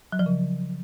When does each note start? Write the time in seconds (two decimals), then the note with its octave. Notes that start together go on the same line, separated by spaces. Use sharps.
0.12 F#3
0.19 F3
0.26 C#3